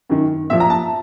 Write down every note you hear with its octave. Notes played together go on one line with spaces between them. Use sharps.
F#2 D#3
A#2 F3 E5
A#5
A5